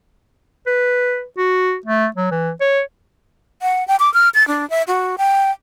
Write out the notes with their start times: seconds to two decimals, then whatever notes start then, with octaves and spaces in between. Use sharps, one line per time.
0.67 B4
1.38 F#4
1.86 A3
2.16 F#3
2.31 E3
2.61 C#5
3.62 F#5
3.88 G5
4.00 D6
4.14 F6
4.35 A6
4.48 D4
4.70 E5
4.88 F#4
5.18 G5